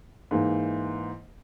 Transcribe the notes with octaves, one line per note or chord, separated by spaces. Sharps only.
G#2 E3 A#3